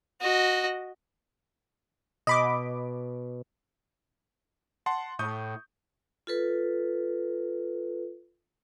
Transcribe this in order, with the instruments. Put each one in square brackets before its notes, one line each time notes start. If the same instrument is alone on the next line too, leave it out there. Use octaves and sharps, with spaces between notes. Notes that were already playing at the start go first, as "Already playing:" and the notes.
[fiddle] F#4 D#5
[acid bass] B2 [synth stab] D#5 B5 D6
[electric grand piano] F#5 A5 C6
[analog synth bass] A2 [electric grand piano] C#6 D#6 G6
[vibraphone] F4 A4 B4